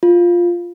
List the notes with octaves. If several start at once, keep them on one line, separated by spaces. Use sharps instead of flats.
F4